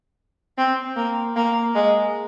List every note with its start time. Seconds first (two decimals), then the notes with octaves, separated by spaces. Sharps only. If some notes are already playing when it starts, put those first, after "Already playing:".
0.58 C4
0.96 A#3
1.36 A#3
1.75 G#3